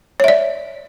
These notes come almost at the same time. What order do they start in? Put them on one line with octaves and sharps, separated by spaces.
C#5 E5 D5